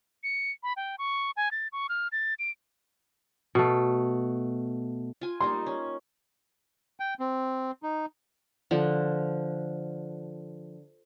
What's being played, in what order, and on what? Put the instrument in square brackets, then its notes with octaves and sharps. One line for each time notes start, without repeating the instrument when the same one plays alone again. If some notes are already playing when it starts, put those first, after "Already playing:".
[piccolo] C#7
B5
G5
C#6
G#5
A6
C#6
F6
A6
D7
[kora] B2 A3
[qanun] F4 G#5
[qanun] G3 A#3 D#4 [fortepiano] C6
[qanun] C#4
[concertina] G5
C4
D#4
[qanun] D3 F3